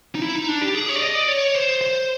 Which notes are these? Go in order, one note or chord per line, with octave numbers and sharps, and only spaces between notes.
D#4
E4
D#4
D4
G4
G#4
C#5
D5
D#5
D5
C#5
C5
C5